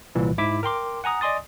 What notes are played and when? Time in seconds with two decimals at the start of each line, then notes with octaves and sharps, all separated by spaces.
0.15 C2 A#2 E3
0.38 G#2 E4 D6 B6
0.63 A#4 G5 C6 D6
1.04 F#5 G#5 A#5 D#6
1.21 D5 D#5 G#5 C6 D#6 A6